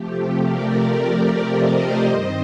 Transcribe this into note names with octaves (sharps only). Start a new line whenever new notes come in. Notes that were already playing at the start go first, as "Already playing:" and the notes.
Already playing: C3 F3 A3 G4
A#4 D5
C5 D#5
G2 D#3 G3 C4 C5 D#5